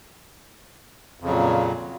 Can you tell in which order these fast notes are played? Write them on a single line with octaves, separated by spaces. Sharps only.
F2 C#3 F#3 A#2